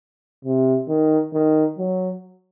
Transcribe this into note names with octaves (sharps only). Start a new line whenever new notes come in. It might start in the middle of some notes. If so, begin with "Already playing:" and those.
C3
D#3
D#3
F#3